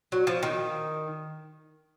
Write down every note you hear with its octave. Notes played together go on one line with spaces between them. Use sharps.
F#3
F3
D#3